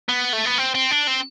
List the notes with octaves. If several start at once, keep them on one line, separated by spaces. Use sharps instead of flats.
B3
A3
B3
C4
C4
D4
C4